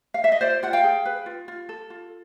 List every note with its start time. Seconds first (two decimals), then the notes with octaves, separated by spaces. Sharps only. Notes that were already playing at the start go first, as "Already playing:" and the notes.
0.14 F5
0.24 E5
0.32 D#5
0.41 F4 C5 D5
0.63 F4 F#5
0.73 F5 G5
0.84 G#4
1.05 B4
1.26 F4
1.48 F4
1.69 A4
1.90 F4